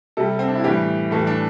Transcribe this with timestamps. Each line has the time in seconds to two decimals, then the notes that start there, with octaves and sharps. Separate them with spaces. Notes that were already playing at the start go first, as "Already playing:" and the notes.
0.17 C3 G3 A4
0.39 C4
0.48 D4
0.55 E4
0.64 A2 E3 G3 G4
1.11 A2 E3 G3 A4
1.27 D4